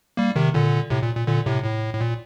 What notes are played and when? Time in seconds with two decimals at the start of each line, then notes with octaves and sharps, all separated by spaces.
0.17 G3 A#3
0.36 C3 D#3
0.54 A#2 D3
0.90 A2 C3
1.03 A#2
1.16 A#2
1.27 A#2 D3
1.46 A2 C3
1.64 A2
1.94 A2
2.01 A#2